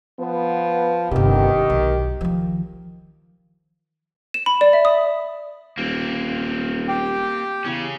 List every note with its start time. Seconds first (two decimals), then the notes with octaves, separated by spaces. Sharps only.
0.20 F3 B3
1.11 G1 C3 D#3 G4
1.70 B1
2.21 D#3 F3
4.34 E7
4.46 B5
4.61 D5
4.73 E5
4.85 D#6
5.78 D#1 A#3 C4
6.88 G4 G5
7.65 E2 C#3 C#4